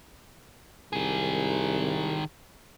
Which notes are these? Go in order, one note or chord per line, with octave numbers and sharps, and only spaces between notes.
C2 D#3 G#4